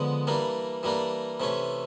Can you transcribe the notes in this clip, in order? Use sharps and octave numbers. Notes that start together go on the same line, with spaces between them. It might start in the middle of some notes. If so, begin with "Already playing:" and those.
Already playing: D3 F3 G#3 B3
E3 G3 A#3 D4
E3 G3 A#3 D4
C3 E3 A3 C#4